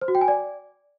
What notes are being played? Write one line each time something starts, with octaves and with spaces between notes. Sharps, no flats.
C5
F#4
G5
G#5
D5